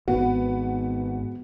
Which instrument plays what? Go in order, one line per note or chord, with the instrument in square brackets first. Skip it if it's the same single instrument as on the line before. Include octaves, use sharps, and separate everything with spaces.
[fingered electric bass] G#1 [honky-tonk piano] B3 [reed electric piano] F#4